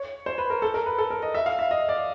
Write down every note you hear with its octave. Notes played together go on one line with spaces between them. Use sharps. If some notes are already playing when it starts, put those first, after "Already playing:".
Already playing: C#5
C5
B4
A#4
A4
A#4
B4
A4
A#4
D#5
E5
F5
E5
D#5
D5